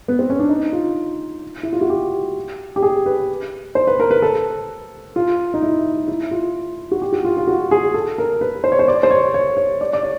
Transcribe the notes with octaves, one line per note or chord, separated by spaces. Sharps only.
B3
C4
C#4
D4
D#4
F4
E4
F4
F#4
G4
G4
G#4
B4
C5
B4
A#4
B4
A4
F4
D#4
E4
E4
F4
F#4
G4
F#4
F4
F4
F#4
G#4
A4
A#4
B4
C5
C#5
C5
D5
C5
C#5
C#5
C#5
D5
D5
C#5